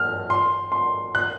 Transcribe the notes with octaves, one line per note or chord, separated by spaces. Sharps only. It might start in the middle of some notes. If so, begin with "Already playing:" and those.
Already playing: F6
C6
C6
F#6